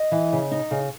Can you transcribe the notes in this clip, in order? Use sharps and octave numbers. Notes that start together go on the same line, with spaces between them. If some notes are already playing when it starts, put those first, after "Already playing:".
Already playing: D#5
E3
C#3
D#4
C#3